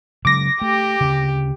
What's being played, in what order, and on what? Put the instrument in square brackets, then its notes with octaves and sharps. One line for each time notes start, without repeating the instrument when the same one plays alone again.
[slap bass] C#3 F#3 G#3 [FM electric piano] D6 A#6
[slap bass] A3 [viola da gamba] G4
[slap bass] D2 C#3